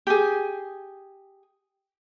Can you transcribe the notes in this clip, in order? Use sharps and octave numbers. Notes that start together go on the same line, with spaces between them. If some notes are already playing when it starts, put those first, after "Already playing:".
G4 G#4